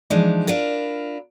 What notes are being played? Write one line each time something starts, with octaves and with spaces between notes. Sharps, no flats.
E3 F3 G#3 D4 D#4
D4 E4 F4 A#4